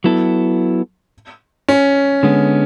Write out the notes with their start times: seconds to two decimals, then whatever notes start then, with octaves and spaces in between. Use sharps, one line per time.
0.04 F#3 B3 E4 A4
1.68 C#4
2.23 D3 G#3 B3